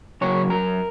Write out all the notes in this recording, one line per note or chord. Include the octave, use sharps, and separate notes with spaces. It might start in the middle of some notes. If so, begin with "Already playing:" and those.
C#3 F#3 A#3 C#5
F#2 A#4